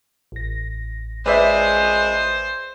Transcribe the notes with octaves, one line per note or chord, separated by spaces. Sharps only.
A1 A#6
G#3 B4 C5 D5 E5